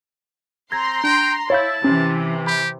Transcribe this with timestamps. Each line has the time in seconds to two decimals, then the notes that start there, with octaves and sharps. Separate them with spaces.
0.72 C4 A#5 C6 G#6 A#6
1.04 D4 G5
1.50 E4 C#5 F5 A5 G6
1.84 C3 E3 C#4
2.47 G4 B5